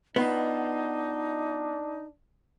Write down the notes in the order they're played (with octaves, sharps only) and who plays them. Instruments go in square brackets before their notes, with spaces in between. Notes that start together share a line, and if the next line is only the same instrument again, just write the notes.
[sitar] B2 F4 [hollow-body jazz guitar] B3 [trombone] D4 [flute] D#4